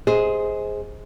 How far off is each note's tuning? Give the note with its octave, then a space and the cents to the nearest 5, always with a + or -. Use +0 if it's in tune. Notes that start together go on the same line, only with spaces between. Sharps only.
G#4 +0 C5 +0 D#5 +25